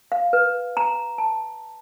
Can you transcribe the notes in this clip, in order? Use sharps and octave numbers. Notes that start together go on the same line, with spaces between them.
F5
B4
A#5
A5